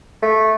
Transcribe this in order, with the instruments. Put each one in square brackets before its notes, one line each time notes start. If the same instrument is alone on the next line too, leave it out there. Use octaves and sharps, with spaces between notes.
[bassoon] A3